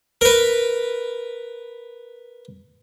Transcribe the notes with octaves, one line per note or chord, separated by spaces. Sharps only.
A#4 B4